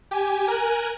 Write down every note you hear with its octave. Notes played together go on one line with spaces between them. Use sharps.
G4 G#5
A#4 G#5 F#6 D#7